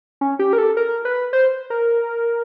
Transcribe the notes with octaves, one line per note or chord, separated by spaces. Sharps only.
C#4
G4
A#4
A4
A#4
B4
C5
A#4